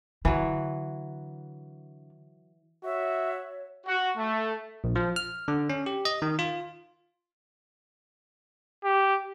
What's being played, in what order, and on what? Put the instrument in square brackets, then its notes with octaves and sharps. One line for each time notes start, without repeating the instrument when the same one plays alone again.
[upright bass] D3 [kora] E3 F#3
[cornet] F#4 [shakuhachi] C#5 [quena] E5
[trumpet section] F#4
A3
[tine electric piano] A#1
F3
F6
D3
C#4
G4
D#5
D#3
F4
[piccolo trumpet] G4